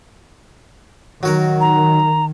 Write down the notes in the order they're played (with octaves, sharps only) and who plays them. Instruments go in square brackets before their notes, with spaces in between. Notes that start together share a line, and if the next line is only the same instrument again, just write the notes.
[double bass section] D#3 [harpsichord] F#3 F#4 A#4
[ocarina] A#5